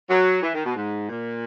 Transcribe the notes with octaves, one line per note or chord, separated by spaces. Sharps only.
F#3
E3
D#3
B2
G#2
A#2